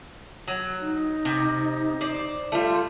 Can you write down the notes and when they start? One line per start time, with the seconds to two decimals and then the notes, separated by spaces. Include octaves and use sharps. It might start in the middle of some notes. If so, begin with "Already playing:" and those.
0.48 F#3
0.81 D#4
1.25 C3
2.01 C5 D5
2.52 G3 A3 F4